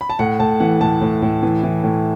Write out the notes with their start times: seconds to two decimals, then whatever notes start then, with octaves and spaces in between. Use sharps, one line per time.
0.01 B5
0.10 A5
0.19 A2 F#5
0.40 A2 A5
0.60 E3 F#5
0.81 A2 A5
1.01 A2
1.22 A2
1.43 E3
1.63 E3
1.84 A2